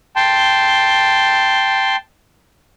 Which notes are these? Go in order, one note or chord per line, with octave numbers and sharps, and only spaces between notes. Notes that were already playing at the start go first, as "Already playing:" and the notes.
G5 A5 C6